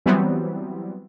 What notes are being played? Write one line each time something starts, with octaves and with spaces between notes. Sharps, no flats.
E3 F#3 G3 B3 C4